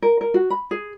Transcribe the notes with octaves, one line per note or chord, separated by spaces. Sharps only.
A#4
A#4
F#4
B5
G#4